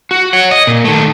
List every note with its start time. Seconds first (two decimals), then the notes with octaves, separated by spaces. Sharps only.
0.11 F#4
0.33 C#5 F#5
0.51 D#5
0.67 A#2
0.84 D#3 A3